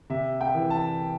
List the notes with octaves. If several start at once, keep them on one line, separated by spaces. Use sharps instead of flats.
C3 E5
G5
E3
A5